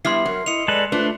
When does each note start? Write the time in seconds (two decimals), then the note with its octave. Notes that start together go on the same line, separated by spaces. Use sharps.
0.05 G3 B3 E4 C6 F6 C7
0.26 F#3 A#4
0.46 E4 D#5 C#7 F7
0.68 G#3 A4 B4 D5
0.92 A3 D4 F4 B4 C5